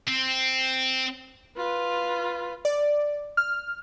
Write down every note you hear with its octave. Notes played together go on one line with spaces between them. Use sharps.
C4
F4 B4
D5
F6